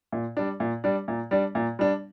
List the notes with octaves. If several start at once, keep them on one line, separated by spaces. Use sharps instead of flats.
A#2
G3 D4
A#2
G3 D4
A#2
G3 D4
A#2
G3 D4